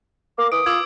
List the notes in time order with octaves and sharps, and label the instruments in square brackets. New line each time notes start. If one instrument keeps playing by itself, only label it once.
[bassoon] A#3 [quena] D6
[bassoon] E3 [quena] D#6 [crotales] D7
[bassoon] F4 [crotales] D6 E6 G#6